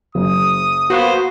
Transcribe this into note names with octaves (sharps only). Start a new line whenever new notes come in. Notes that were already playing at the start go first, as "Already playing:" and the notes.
F#1 D#6
A#3 B3 F#4 C5